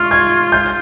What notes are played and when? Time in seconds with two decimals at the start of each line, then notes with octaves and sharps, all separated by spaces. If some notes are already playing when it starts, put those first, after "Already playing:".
Already playing: F4 C#6 F6
0.11 G#6
0.52 G6